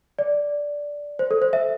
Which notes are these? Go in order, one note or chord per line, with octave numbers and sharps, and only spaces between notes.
D5
C5
A4
C5
E5